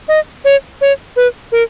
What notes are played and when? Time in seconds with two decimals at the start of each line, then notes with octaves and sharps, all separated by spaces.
0.08 D#5
0.45 C#5
0.81 C#5
1.16 B4
1.52 A#4